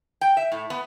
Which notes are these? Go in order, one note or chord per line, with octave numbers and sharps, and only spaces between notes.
G5
E5
A2
B3